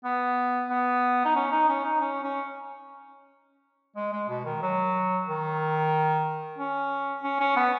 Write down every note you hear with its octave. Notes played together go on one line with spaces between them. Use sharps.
B3
B3
D#4
C#4
D#4
C#4
D#4
C#4
C#4
G#3
G#3
B2
D#3
F#3
D#3
C#4
C#4
C#4
B3